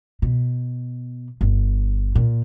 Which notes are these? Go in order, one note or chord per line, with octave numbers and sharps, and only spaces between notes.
B2
G1
A#2